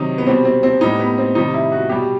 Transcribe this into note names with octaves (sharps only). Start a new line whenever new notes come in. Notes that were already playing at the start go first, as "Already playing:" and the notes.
Already playing: C3 D#3 F#3 D#4
B3
B2 G3 C4
C4
C4
A2 G3 D#4
B3
C4
C3 D#3 G3 D#4
E4
F#4
B2 G3 G4